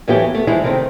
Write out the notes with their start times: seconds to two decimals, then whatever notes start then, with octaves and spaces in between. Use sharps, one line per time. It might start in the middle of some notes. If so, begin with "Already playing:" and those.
0.08 A2 E3 F#3 B3 F4 G4
0.35 A3 B3
0.47 E3 F3 G#3 E4
0.63 C3 D#3 A3 C4